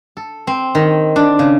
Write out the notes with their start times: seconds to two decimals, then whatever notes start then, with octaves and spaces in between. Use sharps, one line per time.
0.17 A4
0.47 C4
0.75 D#3
1.16 D4
1.39 C#3